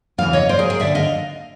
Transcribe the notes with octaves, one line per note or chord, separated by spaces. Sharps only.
E2 C#3 E3 F5
C#5 D#5
C5 D5
G#4 A#4
G#4 A#4
D#2 D3 D5 E5
D#5 F5